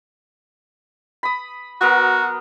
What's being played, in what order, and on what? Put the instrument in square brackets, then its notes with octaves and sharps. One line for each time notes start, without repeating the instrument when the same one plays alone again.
[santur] B5 D#6
[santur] F#3 B3 A#4 [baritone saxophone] F#4